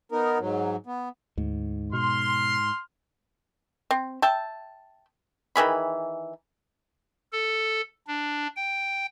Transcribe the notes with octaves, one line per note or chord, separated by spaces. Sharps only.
B3 D#4 A#4
G#2 F#3
B3
D2 G#2
B2 C6 F6
C4
E5 G5 A5
D#3 E3 G#4 B5
A4
D4
G5